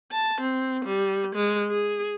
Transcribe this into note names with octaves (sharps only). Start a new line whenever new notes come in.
A5
C4
G3
G#3
G#4